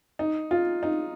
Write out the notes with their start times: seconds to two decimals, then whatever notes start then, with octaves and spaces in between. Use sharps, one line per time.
0.19 D#4
0.51 F4
0.83 D#4